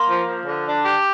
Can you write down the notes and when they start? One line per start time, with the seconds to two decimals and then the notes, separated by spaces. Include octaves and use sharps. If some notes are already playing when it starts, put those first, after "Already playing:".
Already playing: A#3 C6
0.10 F3
0.27 F3
0.46 D3
0.66 D4
0.84 G4